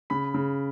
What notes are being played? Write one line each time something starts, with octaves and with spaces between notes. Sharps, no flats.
C#3 B5
C#3